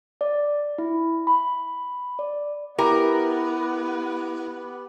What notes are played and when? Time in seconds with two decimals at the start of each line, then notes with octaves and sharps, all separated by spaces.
0.21 D5
0.78 E4
1.27 B5
2.19 D5
2.78 B3 E4 G4 A#4 B4